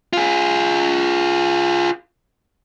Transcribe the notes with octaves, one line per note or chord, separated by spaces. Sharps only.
F4 G#4